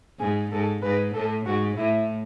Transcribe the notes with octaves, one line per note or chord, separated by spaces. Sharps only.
G#2 G#4
G#2 A4
G#2 B4
A2 A4
G#2 F#4
A2 E4